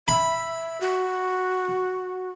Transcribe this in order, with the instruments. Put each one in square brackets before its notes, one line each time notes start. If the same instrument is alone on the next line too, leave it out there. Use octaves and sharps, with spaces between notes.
[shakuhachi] E5 [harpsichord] B5
[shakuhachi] F#4